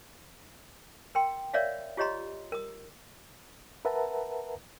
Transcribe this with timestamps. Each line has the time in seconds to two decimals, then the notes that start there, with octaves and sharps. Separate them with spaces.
1.15 A#4 G5 C6
1.54 A#4 C#5 D5 E5 F5
1.97 F4 G4 C#5 D#5 A#5 C6
2.52 A#4 D#6
3.85 A#4 B4 E5 F#5 A5 A#5